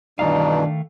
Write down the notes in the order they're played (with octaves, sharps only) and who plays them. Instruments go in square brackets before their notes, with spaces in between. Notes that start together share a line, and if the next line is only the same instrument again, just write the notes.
[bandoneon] G2 B2 E3 [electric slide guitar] D#3 A3 F5 [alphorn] D4 [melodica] D#4